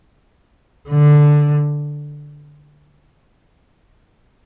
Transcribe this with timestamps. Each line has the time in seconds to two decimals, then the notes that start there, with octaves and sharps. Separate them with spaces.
0.89 D3